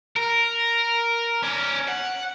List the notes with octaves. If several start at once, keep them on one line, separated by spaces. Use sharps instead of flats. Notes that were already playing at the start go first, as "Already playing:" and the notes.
A#4
C#4 D5
F#5